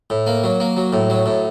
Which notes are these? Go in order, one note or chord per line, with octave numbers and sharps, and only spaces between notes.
A2
A#3
F#3
A#3
F#3
A2
F#3
A2